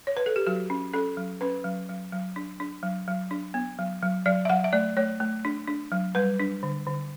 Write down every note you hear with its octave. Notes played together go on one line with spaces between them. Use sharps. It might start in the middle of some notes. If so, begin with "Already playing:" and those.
C#5
B4
A4
G4
F#3 F#4
C#4
C#4 A4
F#3
C#4 B4
F#3
F#3
F#3
D4
D4
F#3
F#3
D4
B3
F#3
F#3
F#3 D5
E5
F#3 F#5
E5
A3 D5
A3 C#5
A3
D4
D4
F#3
G3 B4
D4
D3
D3